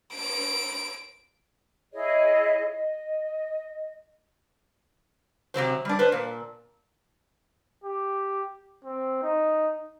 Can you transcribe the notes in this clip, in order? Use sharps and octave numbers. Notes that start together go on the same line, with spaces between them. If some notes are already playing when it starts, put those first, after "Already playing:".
D7
E4 G#4 C#5 D#5
D#5
C3 E3 F#3 C5
G3 D4
B4 C5
A#2
G4
C4
D#4